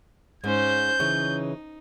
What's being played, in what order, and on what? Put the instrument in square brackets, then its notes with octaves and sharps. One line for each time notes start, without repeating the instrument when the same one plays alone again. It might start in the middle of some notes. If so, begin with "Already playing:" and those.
[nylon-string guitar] G#2 [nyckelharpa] C#4 C5 [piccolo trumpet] G6
[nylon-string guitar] C#3 E3 C#4 [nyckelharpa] D#4